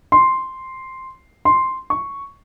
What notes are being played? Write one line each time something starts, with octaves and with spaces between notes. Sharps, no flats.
C6
C6
C#6